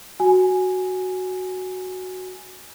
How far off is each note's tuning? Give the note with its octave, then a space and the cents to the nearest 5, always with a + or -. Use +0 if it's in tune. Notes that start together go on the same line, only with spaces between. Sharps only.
F#4 +0 G#5 +0